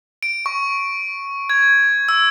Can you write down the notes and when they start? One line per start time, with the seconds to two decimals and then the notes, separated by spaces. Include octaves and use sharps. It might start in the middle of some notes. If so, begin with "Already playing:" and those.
0.23 D7
0.46 C#6
1.50 G#6
2.09 E6